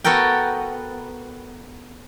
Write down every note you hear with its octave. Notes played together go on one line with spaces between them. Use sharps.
B3 F#4 A4 A#4 G5